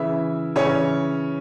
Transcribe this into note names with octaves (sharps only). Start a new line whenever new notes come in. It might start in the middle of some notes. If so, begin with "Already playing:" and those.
Already playing: C#3 E3 E4 E5
C#3 E3 C#4 C#5